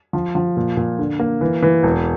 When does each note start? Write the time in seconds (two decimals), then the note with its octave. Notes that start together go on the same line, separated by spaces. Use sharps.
0.13 F3
0.35 F3
0.57 A#2
0.77 A#2
0.99 D3
1.19 A#3
1.41 E3
1.62 E3
1.83 E1